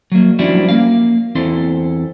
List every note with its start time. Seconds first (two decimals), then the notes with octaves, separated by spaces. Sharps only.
0.12 F#3 A#3
0.39 F3 G3 C#4 D4 E4 F#4
0.69 A#3 F5
1.35 E2 C4 E4 A4 C6